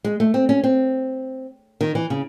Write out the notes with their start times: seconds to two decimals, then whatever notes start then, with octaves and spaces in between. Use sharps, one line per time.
0.04 G#3
0.20 A3
0.34 C4
0.49 C#4
0.64 C4
1.81 D#3
1.95 E3
2.10 C#3